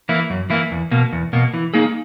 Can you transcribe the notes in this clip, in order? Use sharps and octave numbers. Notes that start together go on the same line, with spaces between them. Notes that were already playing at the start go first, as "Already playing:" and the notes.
E3 A#3 E4
F#2
E3 A#3 E4
E2
B2 A#3
E2
B2 A#3
E3
A#3 D#4 G#4